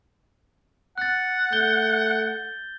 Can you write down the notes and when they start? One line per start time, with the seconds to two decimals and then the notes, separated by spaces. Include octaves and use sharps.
0.98 F#5 F#6 A6
1.53 A3 G6 G7